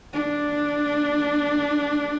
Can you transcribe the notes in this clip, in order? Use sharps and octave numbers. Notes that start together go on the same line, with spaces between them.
D4